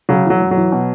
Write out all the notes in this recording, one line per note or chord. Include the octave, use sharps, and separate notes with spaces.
C#3 F#3
E3 F#3
F#2
F#3
E3
B2